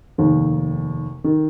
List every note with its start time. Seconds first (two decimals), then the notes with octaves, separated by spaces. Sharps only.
0.18 F1 D#2 D#3
1.24 D#3